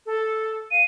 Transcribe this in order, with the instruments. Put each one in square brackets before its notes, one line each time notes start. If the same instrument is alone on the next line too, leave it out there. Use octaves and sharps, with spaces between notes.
[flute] A4
[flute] F5 [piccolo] D#7